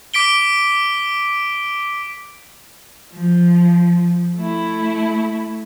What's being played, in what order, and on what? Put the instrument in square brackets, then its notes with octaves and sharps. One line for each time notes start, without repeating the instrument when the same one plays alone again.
[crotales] D6 B6 D7 G7
[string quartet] F3
A3 E4